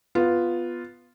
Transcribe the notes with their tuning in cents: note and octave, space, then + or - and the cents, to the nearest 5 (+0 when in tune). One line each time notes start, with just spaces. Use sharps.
B3 +0 F4 +0